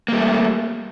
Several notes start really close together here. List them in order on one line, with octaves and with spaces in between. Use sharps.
A#3 G3 A3